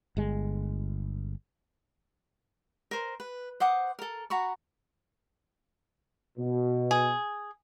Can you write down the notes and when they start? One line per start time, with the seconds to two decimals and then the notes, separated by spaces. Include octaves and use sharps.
0.17 G1 G#3
2.91 A#4 C5
3.20 B4
3.60 C5 F#5 D6 D#6
3.99 A4 A#4
4.30 F#4 A#5 B5 C#6
6.38 B2
6.91 G#4